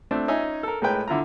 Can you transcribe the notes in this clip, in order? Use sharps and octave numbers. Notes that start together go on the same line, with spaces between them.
A3 C4 D4
C#4 D#4 E5 G#5
A4 A#4
A2 G#3 A#4 B4 G5
D3 E4 F4 A#5